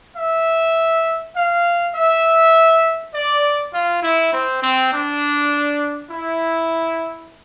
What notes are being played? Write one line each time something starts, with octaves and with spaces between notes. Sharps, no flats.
E5
F5
E5
D5
F4
E4
C4
C4
D4
E4